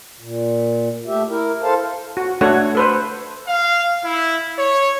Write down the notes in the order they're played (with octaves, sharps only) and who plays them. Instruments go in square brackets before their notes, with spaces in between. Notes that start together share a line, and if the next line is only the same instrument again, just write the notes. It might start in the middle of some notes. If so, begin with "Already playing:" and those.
[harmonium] A#2
A3 G4 E5
E4 A#4
A4 C5 F5 A5
[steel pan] F#4
A3 D4 F#4 A4 C#5 F#5
A4 B4 C5
[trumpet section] F5
E4
C#5